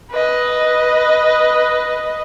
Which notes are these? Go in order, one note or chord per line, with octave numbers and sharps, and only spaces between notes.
B4 D#5